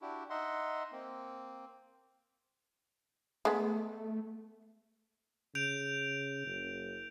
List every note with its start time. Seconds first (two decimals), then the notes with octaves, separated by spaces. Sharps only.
0.02 D4 E4 F#4 G4
0.30 D#4 D#5 E5 F#5 C6
0.92 A#3 C4
3.45 G#3 A3 B3
5.55 C#3 G6 D7 F7
6.46 F#1